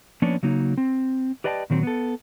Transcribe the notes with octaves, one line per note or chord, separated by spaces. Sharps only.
F3 A#3 B3 C#4 D4 C#5
C#3 F#3 A#3 D#4
C4
G4 B4 D5 D#5 G5 A5
A#2 D#3 F#3 C4
B3 A4